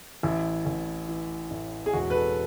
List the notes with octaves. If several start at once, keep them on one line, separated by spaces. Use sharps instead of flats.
A1 E4
A1
E3
A2
G#4
E1 F#4
B4
A4